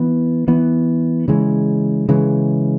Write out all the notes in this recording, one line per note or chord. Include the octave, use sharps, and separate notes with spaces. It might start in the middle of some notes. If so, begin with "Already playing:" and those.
Already playing: E3 B3
E3 B3
C#3 E3 G#3
C#3 E3 G#3